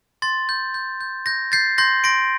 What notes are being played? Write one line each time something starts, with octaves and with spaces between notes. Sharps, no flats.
C6 A6
G6
G6
G6
G6 A#6
G6 A6 C7
C6 G6 A#6
C6 A#6 D7